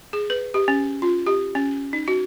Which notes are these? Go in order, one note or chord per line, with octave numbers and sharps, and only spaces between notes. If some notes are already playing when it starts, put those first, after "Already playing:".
G#4
B4
G4
C#4
F4
G4
C#4
D#4
F#4